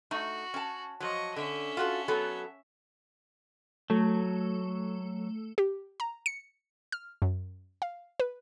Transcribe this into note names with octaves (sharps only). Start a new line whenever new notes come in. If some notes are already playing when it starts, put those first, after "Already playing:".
A3 D#4 F#4
C#4 A5
F3 F#3 D#5 C#6
D3 C#4 E5
F4 F#4 A4
F#3 B3 A4
F#3 A3
G4
A#5
C#7
F6
F#2
F5
B4